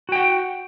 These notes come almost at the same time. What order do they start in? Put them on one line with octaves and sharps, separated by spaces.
F#4 G5 F#5